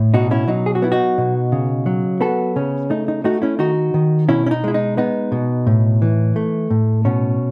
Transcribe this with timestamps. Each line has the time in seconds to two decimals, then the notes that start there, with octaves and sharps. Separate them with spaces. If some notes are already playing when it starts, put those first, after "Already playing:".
Already playing: A2
0.14 B2 D#4 F#4
0.31 C#4 E4
0.48 F#3 D#4
0.66 G#4
0.75 F#4
0.82 B3 E4
0.92 D#4 F#4
1.18 B2
1.52 C#3
1.86 F#3
2.21 B3 F#4 A4
2.56 C#3 C#4
2.90 A3 D#4
3.08 D#4
3.24 A3 D#4 F#4
3.42 C#4 E4
3.59 D#3 D#4 F#4
3.94 D#3
4.29 B2 C#4 E4
4.46 C#4
4.51 D#4
4.64 G#3 E4
4.74 D#4
4.97 B3 D#4
5.32 B2
5.67 A2
6.02 E3
6.36 A3
6.70 A2
7.05 B2 C#4